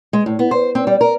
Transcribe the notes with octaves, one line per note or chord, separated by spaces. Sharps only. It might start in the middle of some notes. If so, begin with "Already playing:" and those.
G#3
A2
B3
C5
C4
G3
A#4